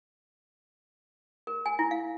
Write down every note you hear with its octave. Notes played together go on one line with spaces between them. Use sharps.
A#4
G#5
E4
F5